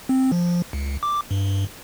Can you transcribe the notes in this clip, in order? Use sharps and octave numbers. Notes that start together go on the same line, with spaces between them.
C4
F3
C#2
D6
G2